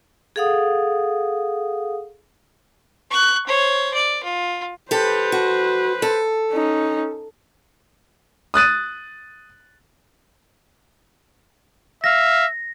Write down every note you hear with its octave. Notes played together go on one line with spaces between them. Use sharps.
G#4 A4 F5 F#5 D#6
C#6 F#6
C5 C#5
D5
F4
G4 A4 B4 C5
F#4
A4
C#4 D#4
D#6 F#6 A6 D#7
E5 F5 A#6